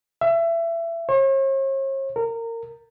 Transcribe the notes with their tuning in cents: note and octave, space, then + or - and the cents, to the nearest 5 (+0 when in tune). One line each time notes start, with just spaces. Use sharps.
E5 +25
C#5 -45
A#4 -25